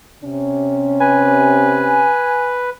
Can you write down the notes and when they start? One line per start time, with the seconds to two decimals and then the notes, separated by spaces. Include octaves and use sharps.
0.24 C3 C#4
1.00 B4 G#5